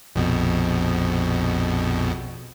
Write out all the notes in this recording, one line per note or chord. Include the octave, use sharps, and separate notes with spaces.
A#1 F2 B2